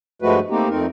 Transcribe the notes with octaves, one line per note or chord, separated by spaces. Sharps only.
G2 F3 G#3 A3 F#4 B4
A3 A#3 C4 D#4 G4
F2 A3 C4 D#4 A#4